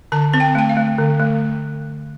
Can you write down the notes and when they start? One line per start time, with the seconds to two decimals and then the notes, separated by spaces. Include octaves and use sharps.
0.12 D3 A5
0.33 C4 A5
0.40 G5
0.55 A3 G5
0.69 F5
0.77 A3
0.98 D3
1.20 A3